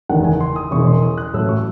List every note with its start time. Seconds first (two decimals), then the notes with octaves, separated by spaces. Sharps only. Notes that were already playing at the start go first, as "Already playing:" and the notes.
0.09 F#1 E2 D#3 F#5
0.25 G#5
0.40 C6
0.56 D#6
0.71 E1 E2 C#3 C#6
0.87 C6
1.02 D#6
1.18 F#6
1.34 A1 A2 F#3 A3 E6
1.49 C#6